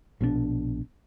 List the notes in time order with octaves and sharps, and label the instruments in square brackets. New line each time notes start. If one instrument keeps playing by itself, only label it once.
[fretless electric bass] A#1 B2 E3 D4